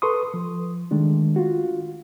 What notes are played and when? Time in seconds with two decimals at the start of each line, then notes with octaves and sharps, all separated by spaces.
0.02 A4 B4 C6 C#6 D#6
0.34 F3
0.91 D#3 G#3 A3 D4
1.36 F4 F#4